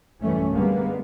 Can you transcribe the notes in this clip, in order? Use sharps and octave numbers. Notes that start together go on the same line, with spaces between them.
F#2 E3 G3 A3 C#4
D3 G3 G#3 A#3 B3